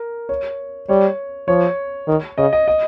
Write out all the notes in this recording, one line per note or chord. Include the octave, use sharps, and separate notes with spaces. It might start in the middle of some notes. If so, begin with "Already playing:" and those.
Already playing: A#4
C#5
G3 C#5
F3 C#5
D#3
C#3 D#5
D#5
D#5